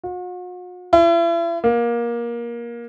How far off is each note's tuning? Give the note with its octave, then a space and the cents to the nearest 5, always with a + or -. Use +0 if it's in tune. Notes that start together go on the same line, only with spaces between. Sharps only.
F#4 -45
E4 +40
A#3 +20